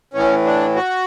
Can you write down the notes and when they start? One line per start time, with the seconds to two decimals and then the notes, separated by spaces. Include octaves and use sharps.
0.14 A2 E3 C#4
0.45 D4
0.75 F#4